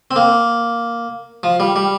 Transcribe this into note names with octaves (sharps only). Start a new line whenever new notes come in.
C4
A#3
F3
G3
G3